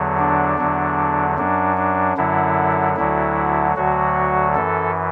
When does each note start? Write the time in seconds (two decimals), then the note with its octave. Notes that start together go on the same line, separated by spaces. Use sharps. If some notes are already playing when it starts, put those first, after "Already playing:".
Already playing: E2 D3 F#3
0.19 D4
0.58 E2 D3 F#3
1.38 F#2 F#3 D4
1.77 D4
2.17 F#2 D3 F#3 E4
2.96 D2 D3 F#3 E4
3.76 D2 D3 F#3 F#4
4.55 F#2 E3 A4